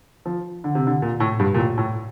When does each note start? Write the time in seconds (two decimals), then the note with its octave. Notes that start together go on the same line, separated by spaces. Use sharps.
0.26 F3
0.64 D3
0.75 C3
0.87 D3
1.02 A#2
1.20 A2
1.39 G2
1.54 A#2
1.58 A2
1.78 A2